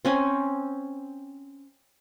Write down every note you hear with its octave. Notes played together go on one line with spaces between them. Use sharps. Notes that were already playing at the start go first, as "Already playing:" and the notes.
C4 C#4 G#5